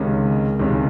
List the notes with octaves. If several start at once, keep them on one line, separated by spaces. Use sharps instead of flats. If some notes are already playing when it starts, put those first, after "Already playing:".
Already playing: C#2 C3 D#3 G#3 C#4
C#2 C3 D#3 G#3 C#4